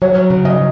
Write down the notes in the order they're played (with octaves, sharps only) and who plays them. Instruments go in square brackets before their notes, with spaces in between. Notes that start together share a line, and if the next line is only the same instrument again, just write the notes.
[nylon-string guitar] F#3 [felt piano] C#5
[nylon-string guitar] C#3
[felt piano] D#5